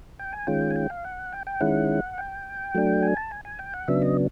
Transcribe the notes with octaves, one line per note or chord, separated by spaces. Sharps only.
G5
G#5
D#3 G#3 C#4 F4 G5
G#5
G5
F5
F#5
G5
G5
D#3 G#3 C#4 E4 F#5
G5
F#3 A3 D4
G#5
A5
G#5
G#5
G5
F#5
C#3 F#3 B3 D4 E5
D#5